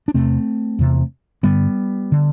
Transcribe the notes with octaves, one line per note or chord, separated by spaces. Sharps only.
D4
E2 C3 A3 C4
E2 C3
G2 D3 G3 B3
D3